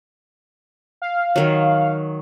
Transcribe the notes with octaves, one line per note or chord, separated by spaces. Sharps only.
F5
D#3 F#3